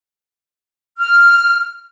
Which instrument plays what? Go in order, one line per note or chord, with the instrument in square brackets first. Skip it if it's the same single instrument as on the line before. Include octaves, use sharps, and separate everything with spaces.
[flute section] F6